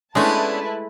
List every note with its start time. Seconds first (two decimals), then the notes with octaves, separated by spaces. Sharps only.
0.15 G#3 A3 B3 C#4 D4 E4 B4 A5